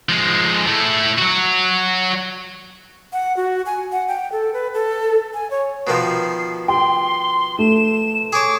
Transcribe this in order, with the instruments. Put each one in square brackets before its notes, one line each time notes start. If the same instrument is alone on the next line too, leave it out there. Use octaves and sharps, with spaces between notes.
[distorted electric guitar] F3 G#3
A3 E4
F#3 F#4
[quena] F#5
F#4
G#5
F#5
G5
A4
B4
A4
G#5
C#5
[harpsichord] B2 D#3 F3 [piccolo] C7
[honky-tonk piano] G5 [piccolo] C6
[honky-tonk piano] A3 [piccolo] E7
[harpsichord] G#4 C#5 [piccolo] D6